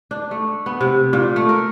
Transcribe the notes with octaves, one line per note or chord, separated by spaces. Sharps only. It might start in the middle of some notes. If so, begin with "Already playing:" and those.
D4
A3
B3
C3
A#2
A3
A#4